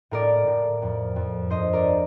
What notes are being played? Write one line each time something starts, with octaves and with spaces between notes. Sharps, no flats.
A2 A#4 D5
A2
F2
F2
G2 C5 D#5
A#4 D5